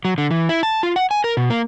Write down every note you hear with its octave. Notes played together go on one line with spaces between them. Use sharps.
F#3
D3
E3
E4
A5
F4
F#5
G#5
A#4
B2
A#3